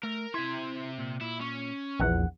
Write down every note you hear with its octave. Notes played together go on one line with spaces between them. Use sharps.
A3 A#4
C3 E4 E5 C6
A#2
A#2 E4
C#4
A#1 E2 F#5